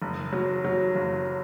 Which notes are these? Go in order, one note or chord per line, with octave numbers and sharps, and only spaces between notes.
F#1
F#3
F#3
F#1